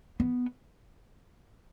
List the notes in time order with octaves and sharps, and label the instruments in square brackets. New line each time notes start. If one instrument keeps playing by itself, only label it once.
[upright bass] B3